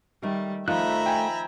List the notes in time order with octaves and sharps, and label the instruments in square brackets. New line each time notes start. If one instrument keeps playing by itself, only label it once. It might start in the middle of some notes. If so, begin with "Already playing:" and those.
[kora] D#3 A3 A#4 [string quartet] G3
[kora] D#3 F3 D#4 [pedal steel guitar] A3 F#6 [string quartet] E5 A#5 B5
[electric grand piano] G5 G#5